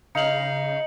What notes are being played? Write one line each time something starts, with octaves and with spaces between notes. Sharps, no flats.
C#3 D#4 F5 C#7 F#7